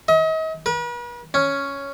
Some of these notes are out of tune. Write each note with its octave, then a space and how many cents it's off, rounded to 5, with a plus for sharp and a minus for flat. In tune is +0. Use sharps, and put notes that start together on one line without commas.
D#5 +40
B4 -45
C#4 +0